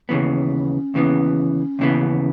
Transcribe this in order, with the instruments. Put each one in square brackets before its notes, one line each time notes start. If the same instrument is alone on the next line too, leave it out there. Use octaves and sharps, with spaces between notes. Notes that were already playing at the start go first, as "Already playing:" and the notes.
[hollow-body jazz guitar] D#2 C#3 E3 B3 [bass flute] C#4
[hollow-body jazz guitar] D#2 C#3 E3 B3
D#2 C#3 E3 B3